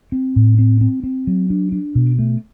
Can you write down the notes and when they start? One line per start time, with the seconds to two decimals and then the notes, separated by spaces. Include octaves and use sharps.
0.12 C4
0.36 A2
0.58 C4
0.81 C4
1.03 C4
1.27 F#3
1.50 D4
1.72 D4
1.95 B2
2.19 A3